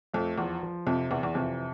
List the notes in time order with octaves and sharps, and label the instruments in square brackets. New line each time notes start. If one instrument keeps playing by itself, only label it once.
[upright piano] F2 [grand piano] A3
[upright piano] E2 [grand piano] F3
[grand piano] F3
[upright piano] F2 [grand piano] C3
[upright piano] E2 [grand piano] E3
[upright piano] E2
[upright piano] F2 [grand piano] C3